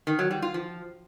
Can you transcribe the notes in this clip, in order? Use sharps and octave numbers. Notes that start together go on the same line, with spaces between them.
D#3
F#3
G3
F4
F3